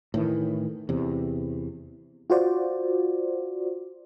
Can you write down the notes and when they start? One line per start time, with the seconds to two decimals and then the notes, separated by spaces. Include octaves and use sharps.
0.14 A2 D#3 E3
0.89 E2 C3
2.30 F4 F#4 C5 D5